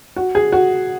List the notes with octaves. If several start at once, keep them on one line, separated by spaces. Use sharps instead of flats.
F#4
G#4
F#4